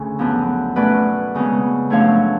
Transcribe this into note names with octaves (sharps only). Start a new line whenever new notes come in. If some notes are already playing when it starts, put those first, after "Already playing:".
Already playing: D2 C#3 C#4
F#2 F3 B3 D4
B2 A3 C#4 B4 D5
F2 C#3 G#3 B3
F#2 F3 A3 D4 C#5 F5